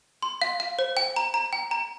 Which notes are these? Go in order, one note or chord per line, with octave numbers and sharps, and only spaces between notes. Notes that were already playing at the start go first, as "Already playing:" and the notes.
C6
F5
F5
C5
G5
A#5
A#5
G5
A#5